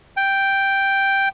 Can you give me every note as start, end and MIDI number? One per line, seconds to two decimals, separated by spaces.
0.17 1.28 79